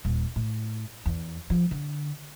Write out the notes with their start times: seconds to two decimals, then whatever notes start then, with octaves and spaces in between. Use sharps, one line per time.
0.05 D#1
0.36 A2
1.06 E2
1.50 F3
1.71 D3